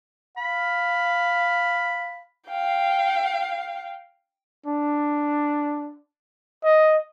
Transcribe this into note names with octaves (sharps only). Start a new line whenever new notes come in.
F5 B5
F5 G5
D4
D#5